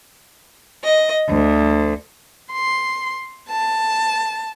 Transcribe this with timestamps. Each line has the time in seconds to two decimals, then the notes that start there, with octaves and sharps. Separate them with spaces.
0.84 D#5
1.29 D2
2.53 C6
3.49 A5